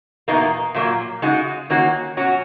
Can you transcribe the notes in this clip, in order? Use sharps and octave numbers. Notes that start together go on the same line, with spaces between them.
E2 B2 A#3 D#4
A#2 F#3 A#3
C#3 G#3 D#4 F#4
D#3 A#3 C#4 F#4
B2 F#3 C#4 F#4